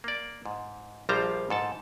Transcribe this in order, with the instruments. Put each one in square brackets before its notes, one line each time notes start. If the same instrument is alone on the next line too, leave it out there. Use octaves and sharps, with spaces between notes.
[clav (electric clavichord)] A#3 D5
G#2
A#1 F3 G3 C5 F5 A#5
G#2 A4 A5